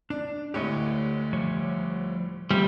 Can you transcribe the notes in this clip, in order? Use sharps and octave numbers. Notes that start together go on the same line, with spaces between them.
D4 D5
D2 A2 D3 G4 C#5 D#5
F3 G3 C#5
D2 G3 A3 B3 F4 C5